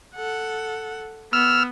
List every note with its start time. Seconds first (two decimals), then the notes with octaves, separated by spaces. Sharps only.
0.16 A4 F#5
1.33 B3 E6 F6